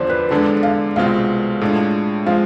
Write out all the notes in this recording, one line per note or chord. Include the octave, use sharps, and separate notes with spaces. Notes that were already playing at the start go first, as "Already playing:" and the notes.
Already playing: E2 D3 F3 C5 D5
B4
E2 D3 G#3 D4 A4
F5
C2 B2 G#3 C4 F4 F5
A2 G#3 D4 F4
F3 G#3 C4 F5